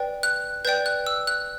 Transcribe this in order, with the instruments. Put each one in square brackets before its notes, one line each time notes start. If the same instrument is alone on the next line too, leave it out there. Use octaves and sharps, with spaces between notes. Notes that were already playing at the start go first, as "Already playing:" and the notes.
Already playing: [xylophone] B4 D5 G5
F#6
B4 D5 G5 G6
F#6
E6
F#6